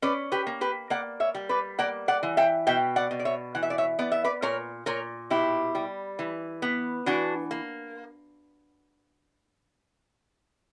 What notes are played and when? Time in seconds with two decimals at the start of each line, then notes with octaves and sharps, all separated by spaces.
0.02 C#4 B4 D5
0.32 G4 B4
0.47 A#3
0.61 G4 B4
0.90 A#3 D5 F#5
1.20 C#5 E5
1.35 G3
1.49 B4 D5
1.79 A#3 D5 F#5
2.08 D5 F#5
2.23 E3
2.37 E5 G5
2.67 B2 E5 G5
2.96 D5 F#5
3.11 B2
3.19 D5
3.25 C#5 E5
3.55 E3 F#5
3.63 E5
3.70 D5
3.78 C#5 E5
3.99 B3 D5
4.12 E5
4.24 B4 D5
4.42 A#2 A#4 C#5
4.86 A#2 A#4 C#5
5.30 B2 E4 G4
5.75 G3
6.19 E3
6.62 B3
7.06 E3 D4 F#4
7.51 A#3